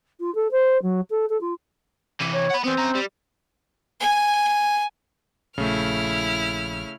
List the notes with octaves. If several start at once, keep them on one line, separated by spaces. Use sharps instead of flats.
F4
A4
C5
F#3
A4
A4
F4
C3 E3
C#5
F#5 B5
E3 B3 C4
C#4 A#5
G3
G#5
A#1 C#3 A3 E4 F6